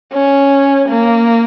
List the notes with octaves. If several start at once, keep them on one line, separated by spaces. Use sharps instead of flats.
C#4
A#3